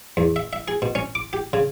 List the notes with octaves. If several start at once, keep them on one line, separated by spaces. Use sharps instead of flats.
E2
E5
E5
G#4
B2
C#4
D6
G4
C#3